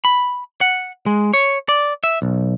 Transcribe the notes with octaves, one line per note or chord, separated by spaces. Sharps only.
B5
F#5
G#3
C#5
D5
E5
B1